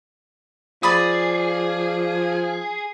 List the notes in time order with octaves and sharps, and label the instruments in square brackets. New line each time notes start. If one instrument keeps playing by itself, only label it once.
[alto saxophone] F3 [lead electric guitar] G#4 [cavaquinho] D5 B5 D#6